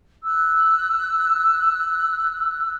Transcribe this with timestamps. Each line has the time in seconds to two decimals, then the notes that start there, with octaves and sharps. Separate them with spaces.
0.24 E6 F#6